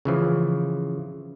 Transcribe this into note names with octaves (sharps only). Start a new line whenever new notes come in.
C#3 E3 F3